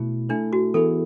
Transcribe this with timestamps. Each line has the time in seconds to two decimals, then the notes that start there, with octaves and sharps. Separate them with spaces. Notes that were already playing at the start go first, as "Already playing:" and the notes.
Already playing: B2 A3 E4
0.29 A3 D4 E4 A4
0.53 F#4
0.74 E3 B3 E4 G#4 A4